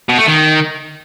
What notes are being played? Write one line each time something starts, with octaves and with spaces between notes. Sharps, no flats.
B2
A3
D#3